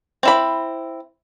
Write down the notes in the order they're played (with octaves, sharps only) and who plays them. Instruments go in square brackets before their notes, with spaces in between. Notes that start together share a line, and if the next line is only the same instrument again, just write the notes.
[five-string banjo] C4 E4 B5